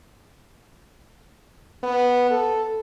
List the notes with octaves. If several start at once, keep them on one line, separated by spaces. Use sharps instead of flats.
B3
A4